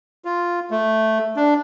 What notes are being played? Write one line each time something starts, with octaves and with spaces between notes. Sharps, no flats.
F4
A3
D4